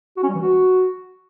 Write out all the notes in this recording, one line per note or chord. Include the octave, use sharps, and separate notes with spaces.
F#4
C#4
G3
E3
F#4